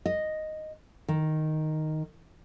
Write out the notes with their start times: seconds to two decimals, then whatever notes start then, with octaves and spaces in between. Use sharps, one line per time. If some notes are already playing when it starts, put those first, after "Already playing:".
0.06 D#5
1.09 D#3